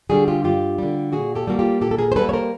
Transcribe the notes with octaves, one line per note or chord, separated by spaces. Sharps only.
D3 G3 F#4 G#4
F4 G4
G2 F4 G4
D3 G3
A#2 F#4 G#4
G4 A4
G3 A#3 F#4
F4 G4
A#2 G4 A4
A4
G#4 A#4
C5
G3 A#3 A4 B4
C#5
A#4 C5